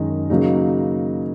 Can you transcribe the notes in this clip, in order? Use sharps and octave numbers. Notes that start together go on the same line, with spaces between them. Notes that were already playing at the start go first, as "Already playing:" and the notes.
Already playing: F#2 D#3 G#3 D#4
C#3 F#3 A#3 D#4